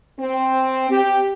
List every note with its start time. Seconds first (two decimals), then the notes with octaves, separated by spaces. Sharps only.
0.19 C4
0.91 G4